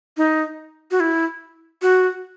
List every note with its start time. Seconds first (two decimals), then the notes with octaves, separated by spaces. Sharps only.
0.17 D#4
0.91 F#4
1.00 E4
1.82 F#4